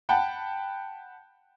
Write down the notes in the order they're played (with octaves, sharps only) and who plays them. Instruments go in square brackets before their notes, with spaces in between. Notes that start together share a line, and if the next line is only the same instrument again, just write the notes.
[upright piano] F#5 G5 A5 B5